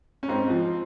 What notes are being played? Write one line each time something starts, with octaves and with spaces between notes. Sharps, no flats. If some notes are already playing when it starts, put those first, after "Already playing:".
C#4
G#2 C4
F3